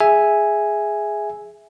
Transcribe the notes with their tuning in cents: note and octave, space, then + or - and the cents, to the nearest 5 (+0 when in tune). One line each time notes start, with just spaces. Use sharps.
G#4 +0 E5 +0 G#5 +0